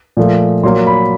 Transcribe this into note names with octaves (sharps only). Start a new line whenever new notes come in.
A#2 F3 A3
A#2 F#3 A#3 C6
B5